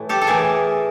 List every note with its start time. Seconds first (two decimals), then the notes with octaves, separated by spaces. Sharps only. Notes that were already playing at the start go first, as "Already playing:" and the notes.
Already playing: A2 E3 A3
0.09 G4 A4
0.22 A4
0.27 A2 E3 A3 G#4 A#4